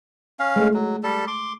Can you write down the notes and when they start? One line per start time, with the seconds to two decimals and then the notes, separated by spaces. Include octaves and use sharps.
0.39 C#4 F5
0.56 G#3 A3
0.74 F#3
1.03 G3 A4
1.28 C6 D6